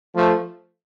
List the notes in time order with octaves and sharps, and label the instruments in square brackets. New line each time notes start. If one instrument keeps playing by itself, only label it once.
[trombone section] F3 A3